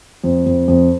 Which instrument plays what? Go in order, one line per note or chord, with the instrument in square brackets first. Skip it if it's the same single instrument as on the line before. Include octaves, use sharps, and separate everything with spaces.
[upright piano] F2
F2
F2